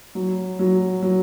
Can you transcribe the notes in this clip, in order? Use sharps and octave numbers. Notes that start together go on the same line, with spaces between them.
F#3
F#3
F#3